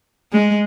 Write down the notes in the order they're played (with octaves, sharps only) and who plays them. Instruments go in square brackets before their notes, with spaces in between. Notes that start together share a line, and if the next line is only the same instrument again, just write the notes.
[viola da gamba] G#3